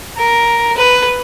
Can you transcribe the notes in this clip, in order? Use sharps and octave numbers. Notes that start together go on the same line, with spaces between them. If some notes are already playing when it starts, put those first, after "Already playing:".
A#4
B4